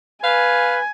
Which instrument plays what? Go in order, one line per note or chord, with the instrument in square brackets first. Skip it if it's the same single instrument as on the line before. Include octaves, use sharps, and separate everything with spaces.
[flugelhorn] B4 [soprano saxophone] F5 [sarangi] G#5